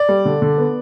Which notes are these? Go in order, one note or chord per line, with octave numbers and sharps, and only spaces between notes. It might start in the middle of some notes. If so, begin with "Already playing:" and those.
Already playing: D5
G3
D3
D3
B3